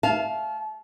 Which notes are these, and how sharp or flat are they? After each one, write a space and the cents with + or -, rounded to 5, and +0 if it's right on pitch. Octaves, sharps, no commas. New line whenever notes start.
F5 +0 A5 -30